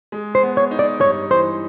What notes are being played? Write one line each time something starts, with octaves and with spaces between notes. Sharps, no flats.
G#3
C5
B3
C#5
D#4
D5
G2 C#5
E3 C5